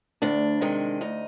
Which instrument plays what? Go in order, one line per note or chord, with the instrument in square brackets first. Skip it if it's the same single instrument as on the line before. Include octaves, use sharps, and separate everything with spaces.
[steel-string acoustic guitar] D2 D4
C3 D#3 G#3
D2 D#4